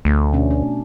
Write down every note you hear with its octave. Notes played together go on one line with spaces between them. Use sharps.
D2 A3
B2 C#4 D4
D4